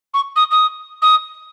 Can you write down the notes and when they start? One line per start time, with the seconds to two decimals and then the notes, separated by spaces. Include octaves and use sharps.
0.14 C#6
0.36 D#6
0.51 D#6
1.02 D#6